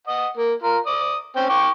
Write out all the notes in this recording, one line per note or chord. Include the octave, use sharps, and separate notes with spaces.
D#5 F#5
A#3
F4 A#4
D5 D#6
C4 C#4 G5
G5 C#6 D6